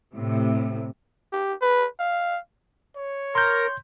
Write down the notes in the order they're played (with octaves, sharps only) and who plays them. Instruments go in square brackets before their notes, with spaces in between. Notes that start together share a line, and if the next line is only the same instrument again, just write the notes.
[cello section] A2 C3
[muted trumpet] G4
B4
F5
[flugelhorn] C#5
[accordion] A#4 [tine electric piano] C6 G6